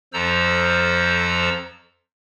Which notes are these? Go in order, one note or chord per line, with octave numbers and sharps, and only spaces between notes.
F2 F3 A4 C5 A#5 E6